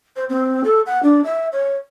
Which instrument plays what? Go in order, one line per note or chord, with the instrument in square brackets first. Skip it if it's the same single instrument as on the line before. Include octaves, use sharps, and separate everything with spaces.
[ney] C5
C4
A4
F#5
D4
E5
C#5